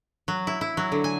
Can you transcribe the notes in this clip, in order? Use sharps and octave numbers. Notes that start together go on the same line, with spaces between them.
F#3
E4
E4
F#3
D3
G#5